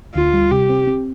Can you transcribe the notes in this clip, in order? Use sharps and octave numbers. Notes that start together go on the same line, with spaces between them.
D2 F4
G3
C3 G4
C4
C4